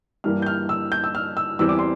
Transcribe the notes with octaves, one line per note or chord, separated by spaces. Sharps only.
G2 E3 G3 A#3 F6
G6
F6
E6
G6
E6
F6
E6
E2 E3 G3 C4 E6
D6
C6